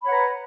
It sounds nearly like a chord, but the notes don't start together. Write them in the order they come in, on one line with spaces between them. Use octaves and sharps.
B5 C#5 F#5 B4 A#5